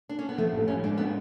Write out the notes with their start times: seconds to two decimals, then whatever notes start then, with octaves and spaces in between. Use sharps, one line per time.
0.09 D4
0.19 C#4
0.29 B3
0.38 F3 A3
0.53 A2
0.68 A2 C#4
0.83 G#3 D4
0.98 B3 D4